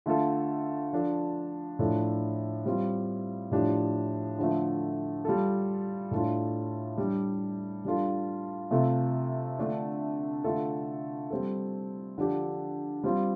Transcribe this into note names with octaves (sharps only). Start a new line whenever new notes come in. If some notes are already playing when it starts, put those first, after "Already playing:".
D3 A3 F4 A4
F3 D4 A4
A2 F3 D4 A4
G3 C4 F4
A2 F3 D4 G4
D3 F3 A3
G3 F4 A4
A2 A3 D4 F4 A4
G3 D4 G4
G3 D4 F4 A4
C3 A3 F4 A4
D3 A3 D4 F4
D3 A3 F4 A4
G3 C4 A4
D3 F3 D4 G4
G3 C4 F4